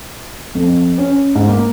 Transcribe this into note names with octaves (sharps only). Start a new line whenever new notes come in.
F2
C#4
G#2
A#3